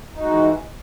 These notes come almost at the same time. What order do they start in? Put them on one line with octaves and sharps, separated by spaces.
D#4 F#4 G#3 E3